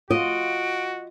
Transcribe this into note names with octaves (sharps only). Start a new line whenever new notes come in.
F4 F#4 D#5 D7